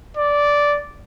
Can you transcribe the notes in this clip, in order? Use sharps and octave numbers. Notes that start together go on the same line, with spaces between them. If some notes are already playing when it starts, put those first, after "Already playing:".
D5